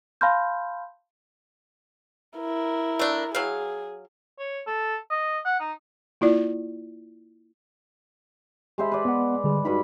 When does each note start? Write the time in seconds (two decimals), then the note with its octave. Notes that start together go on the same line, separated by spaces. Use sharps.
0.21 F5 A5 B5 C6 F6 G6
2.38 E4 A#4
2.99 A3 D4
3.35 F#3 G#4 F5
4.39 C#5
4.67 A4
5.11 D#5
5.46 F#5
5.60 D#4
6.21 A#3 E4 F4 D5
8.78 G#3 G4 C5 E5 B5
8.92 B4 D5
9.05 B3 F#5
9.44 D3 G3 G#4
9.65 G2 D#4 F#4 B5